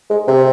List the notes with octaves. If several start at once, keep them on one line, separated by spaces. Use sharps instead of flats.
G#3
C3